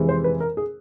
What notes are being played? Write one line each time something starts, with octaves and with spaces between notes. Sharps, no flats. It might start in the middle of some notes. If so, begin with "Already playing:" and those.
Already playing: F2 C3 E3 G#3
C5
B4
A#4
G#4